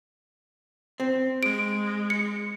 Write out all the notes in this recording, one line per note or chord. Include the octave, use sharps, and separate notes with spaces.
C4
G#3 D7
C#7